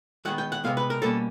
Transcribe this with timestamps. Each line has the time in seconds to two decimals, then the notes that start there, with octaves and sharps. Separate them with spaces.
0.25 D#3 G#3 B3 F#5
0.38 G5
0.52 F#5
0.64 C3 F3 G#3 B3 F5
0.77 B4
0.90 A#4
1.02 B2 G3 A#3 C#4 A4